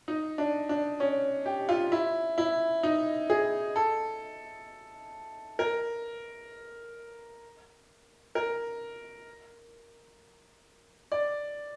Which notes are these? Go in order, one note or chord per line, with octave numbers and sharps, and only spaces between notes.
D#4
D4
D4
C#4
G4
F4
E4
E4
D#4
G#4
A4
A#4
A#4
D5